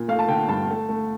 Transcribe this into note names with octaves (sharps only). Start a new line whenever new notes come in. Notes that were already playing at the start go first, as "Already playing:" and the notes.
Already playing: A#2
A3 F5
A5
D3 G5
G2 A5
A3
A3